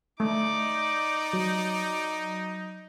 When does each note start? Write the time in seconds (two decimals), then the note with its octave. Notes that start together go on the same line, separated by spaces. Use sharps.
0.20 A3 D#4 D5 D6
1.33 F#3